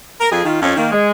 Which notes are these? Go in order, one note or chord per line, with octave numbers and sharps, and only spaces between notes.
A#4
F2 G#4
D#3 F4
F2 C#4
D#3 A#3
G#3